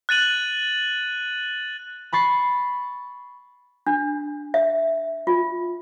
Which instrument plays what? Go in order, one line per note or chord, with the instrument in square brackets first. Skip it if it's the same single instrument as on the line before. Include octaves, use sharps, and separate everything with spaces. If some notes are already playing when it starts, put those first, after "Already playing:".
[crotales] F#6 A6 D#7 F#7
[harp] B5 C#6 A6 C7
[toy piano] D4
E5
F4